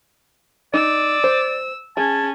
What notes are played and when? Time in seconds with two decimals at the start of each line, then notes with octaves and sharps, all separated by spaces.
0.74 D#4 D5 E6
1.24 C5
1.97 C#4 G#4 A5 G#6